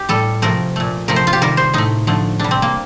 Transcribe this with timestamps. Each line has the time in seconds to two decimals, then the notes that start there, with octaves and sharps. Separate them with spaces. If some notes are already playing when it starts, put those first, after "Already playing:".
Already playing: G4
0.09 A2 G3 A4
0.42 C3 F3 A3 A#4
0.76 A#2 A3
1.08 C3 F3 A3 A#4
1.16 C5
1.27 F4
1.33 G4
1.42 C3 D#3 G3 A#4
1.57 C5
1.74 A2 A3 D#4
2.07 D3 F3 A3
2.39 C3 G3 D4
2.51 C4
2.62 A#3